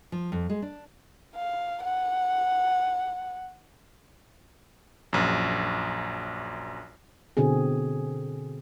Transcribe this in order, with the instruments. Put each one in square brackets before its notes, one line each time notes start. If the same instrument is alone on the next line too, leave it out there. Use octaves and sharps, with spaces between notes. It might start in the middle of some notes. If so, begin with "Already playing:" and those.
[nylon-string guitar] F3
F2
G#3
D4
[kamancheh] F5
F#5
[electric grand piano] A#1 F#2
[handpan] B2 D3 C4 G#4